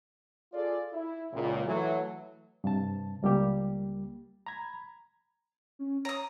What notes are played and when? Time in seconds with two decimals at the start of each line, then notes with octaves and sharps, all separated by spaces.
0.53 F4 G#4 A4 D5
0.93 E4
1.32 C#2 A#2
1.66 E3 F#3 A3
2.64 G2 C3 A5
3.22 C#2 G3 A#3 G4
4.46 A#5 B5 G#6
5.79 C#4
6.05 C#5 A#5 D#6